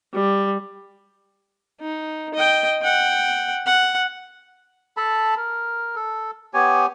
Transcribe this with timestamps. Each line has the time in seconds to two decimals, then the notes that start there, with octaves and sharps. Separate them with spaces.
0.14 G3
1.81 D#4
2.34 D#5 G5
2.82 F#5 G5
3.66 F#5
4.97 A4 A5 B5
5.37 A#4
5.96 A4
6.54 B3 G4 C#5 G#5